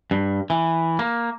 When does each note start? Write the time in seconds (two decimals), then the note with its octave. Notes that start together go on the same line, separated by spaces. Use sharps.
0.11 G2
0.50 E3
0.99 A#3